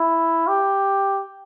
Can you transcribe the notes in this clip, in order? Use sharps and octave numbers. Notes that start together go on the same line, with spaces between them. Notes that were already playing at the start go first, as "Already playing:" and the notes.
Already playing: E4
G4